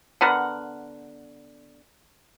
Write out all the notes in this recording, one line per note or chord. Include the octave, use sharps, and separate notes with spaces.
D3 B3 A#4 F#5